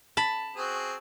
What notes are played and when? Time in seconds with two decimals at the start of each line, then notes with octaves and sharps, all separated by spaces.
0.17 A5 B5
0.56 C4 F#4 G#4